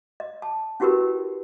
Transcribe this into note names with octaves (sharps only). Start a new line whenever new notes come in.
D#5
A5
C#4 E4 F#4 G4 A#4 B4